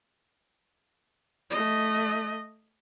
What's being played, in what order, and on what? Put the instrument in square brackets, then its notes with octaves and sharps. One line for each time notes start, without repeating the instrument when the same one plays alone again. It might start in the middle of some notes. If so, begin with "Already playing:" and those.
[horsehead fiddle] A3 D#5